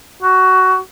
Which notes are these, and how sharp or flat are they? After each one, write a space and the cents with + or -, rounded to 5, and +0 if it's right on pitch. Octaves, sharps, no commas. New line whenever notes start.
F#4 +15